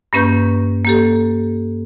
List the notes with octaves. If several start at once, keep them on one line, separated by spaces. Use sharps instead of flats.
G2 A#3 C#4 B4 C#6 G6
A#3 G4 A4